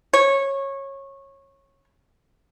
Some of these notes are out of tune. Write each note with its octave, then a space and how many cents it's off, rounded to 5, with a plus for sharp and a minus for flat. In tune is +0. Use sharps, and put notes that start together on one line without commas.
C#5 -20